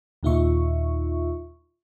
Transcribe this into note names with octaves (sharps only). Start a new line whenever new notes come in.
D#2 A#2 D#4 F4 E5 C#6